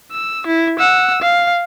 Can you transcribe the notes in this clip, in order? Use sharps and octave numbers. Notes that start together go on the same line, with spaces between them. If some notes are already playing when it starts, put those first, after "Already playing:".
E6
E4
F#5 E6
F5